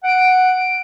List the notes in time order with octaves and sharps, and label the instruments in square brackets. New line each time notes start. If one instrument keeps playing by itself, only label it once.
[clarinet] F#5 [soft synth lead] D7